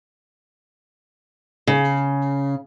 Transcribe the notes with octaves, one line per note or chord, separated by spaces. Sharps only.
C#3